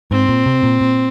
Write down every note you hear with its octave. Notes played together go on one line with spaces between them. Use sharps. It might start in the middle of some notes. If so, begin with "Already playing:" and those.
G#2 C4
A#2
C3
A#2
A#2